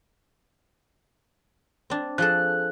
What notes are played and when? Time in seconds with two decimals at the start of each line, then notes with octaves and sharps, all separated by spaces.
1.90 C4 D4
2.18 F3 G#4 A4 F#6